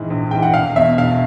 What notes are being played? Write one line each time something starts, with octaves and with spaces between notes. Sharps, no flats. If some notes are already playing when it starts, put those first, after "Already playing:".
Already playing: A#1 G#2 E3
A#1
G#2 E3 G5
F#5
E1 F5
E2 B2 E5
E1 F5